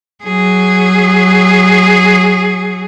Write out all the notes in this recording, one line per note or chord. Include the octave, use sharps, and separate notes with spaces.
F#3 G#4